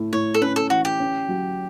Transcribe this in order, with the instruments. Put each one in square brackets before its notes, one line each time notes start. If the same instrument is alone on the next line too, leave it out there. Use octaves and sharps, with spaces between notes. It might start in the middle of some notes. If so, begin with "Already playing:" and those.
Already playing: [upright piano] A2 A3
[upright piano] A2 [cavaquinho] C#5
[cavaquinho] A4
[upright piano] C#4 [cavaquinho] B4
[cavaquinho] A4
[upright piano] E3 [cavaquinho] F#4
[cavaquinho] G4
[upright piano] C#4
F#3